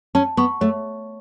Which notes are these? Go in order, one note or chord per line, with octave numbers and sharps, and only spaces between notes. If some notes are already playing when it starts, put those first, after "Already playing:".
C#4 A5
B3 C#6
A3 C#5